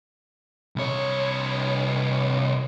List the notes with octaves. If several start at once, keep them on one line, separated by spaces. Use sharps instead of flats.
C2 C#5